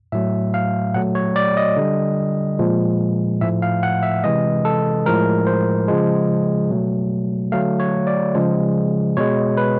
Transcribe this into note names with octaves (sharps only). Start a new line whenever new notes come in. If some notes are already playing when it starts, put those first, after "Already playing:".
A2 F#3 A3 E5
F5
A#2 F#3 A3 F#5
C#5
D5
D#5
D3 G3
A#2 F3 G#3
A2 F3 A3 E5
F5
F#5
E5
C3 E3 G#3 D#5
A4
A2 F3 G#3 A#4
C5
C#3 F3 G#3
B2 F#3 A3
D3 F#3 A3 F5
C#5
D5
C#3 F3 G#3
B2 G#3 C#5
B4